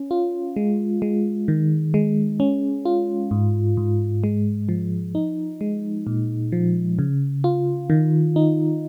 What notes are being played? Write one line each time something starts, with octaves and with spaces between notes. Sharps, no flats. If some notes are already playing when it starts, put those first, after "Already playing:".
Already playing: C#4
F4
G#3
G#3
D#3
G#3
C#4
F4
G#2
G#2
G#3
F3
D#4
G#3
A#2
F3
C#3
F4
D#3
D#4